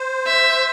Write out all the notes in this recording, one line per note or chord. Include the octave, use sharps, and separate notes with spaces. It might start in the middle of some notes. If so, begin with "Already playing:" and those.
Already playing: C5
E5